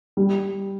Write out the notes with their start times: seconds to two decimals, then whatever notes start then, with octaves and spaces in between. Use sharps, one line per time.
0.17 G3